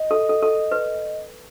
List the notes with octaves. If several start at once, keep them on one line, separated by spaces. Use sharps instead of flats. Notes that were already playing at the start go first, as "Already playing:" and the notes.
Already playing: D#5
A4
A4
A4
B4